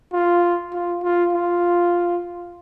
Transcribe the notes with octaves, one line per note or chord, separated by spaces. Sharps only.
F4
F4
F4
F4